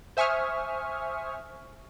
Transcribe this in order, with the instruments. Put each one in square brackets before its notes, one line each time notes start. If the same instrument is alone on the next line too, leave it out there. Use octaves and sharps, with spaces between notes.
[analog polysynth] C5 E5 G#5 C#6 D#6 F6